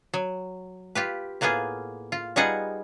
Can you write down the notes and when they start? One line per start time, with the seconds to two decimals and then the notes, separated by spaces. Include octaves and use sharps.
0.14 F#3
0.95 F4 G4 B4
1.41 A2 A#3 B3 F4 G#4
2.12 F4
2.36 G3 B3 D#4 F4 G#4 F#5